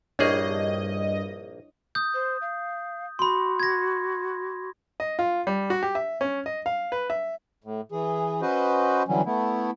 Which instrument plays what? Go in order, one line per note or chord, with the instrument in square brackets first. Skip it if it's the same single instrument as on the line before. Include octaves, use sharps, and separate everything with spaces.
[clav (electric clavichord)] A#1 A#3 G#4 [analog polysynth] G2 D#5 [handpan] D4 E4 C#5
[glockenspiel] D#6 G6
[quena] C5
F5
[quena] F#4 [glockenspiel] B5 C6
[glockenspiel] G#6 A#6
[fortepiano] D#5
F4
G3
F#4
G4
E5
C#4
D#5
F5
B4
E5
[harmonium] A2
E3 G#4
C#4 F#4 B4 C5 D#5
D3 E3 F#3 G3 C#4
A3 B3 E4